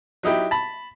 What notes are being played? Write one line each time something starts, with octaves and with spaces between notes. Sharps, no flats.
F#3 D#4 E4 G4
A5 B5